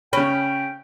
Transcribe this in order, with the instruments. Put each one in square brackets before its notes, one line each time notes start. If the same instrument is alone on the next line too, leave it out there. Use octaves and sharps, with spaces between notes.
[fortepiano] C#3 B5 [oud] C#4 [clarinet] G5